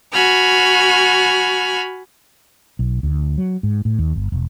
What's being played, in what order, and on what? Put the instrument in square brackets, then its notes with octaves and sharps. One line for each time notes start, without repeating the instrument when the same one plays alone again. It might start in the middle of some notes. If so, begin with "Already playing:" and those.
[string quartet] F#4 G#5 B5 F6
[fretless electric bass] B1
D2
F#3
G#2
A2
D#2
G1
E1